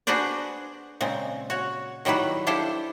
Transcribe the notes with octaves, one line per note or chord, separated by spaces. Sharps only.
D4 F#4 G#4 B4 C5 D5
A#2 C#3 G#3 C4
F#4 C#5
D#3 F#3 G3 E4 B4
D4 E4 F4 G4 A4 C5